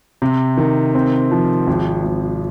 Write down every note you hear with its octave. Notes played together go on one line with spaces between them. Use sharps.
C3
D#3
C4
F3
G#1
G#1